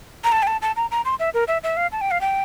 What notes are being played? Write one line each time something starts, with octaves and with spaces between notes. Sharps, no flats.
A#5
A5
G5
A5
A5
A#5
A#5
C6
E5
A#4
E5
E5
F5
A5
G5
F5
G5